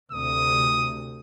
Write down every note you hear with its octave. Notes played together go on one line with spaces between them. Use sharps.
D2 C3 D#6